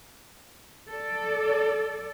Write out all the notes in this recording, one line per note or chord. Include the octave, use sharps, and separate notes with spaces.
A4 D5